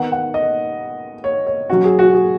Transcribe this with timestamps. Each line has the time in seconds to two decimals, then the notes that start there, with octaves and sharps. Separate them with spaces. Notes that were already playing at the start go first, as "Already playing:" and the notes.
Already playing: D#3 B3 D#4 F#5
0.12 F#5
0.34 D#5
1.24 C#5
1.46 C#5
1.69 F#3 C#4 F#4
1.84 G#4
1.99 F#4
2.14 G#4